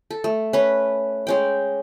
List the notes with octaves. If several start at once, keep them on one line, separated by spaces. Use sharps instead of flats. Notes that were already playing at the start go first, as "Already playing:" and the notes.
A4
A3
C#4 B4
G#3 C#4 G5